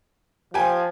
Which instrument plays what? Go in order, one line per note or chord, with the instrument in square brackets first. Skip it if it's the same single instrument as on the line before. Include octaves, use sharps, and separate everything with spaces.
[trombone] F3 [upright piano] G4 G#5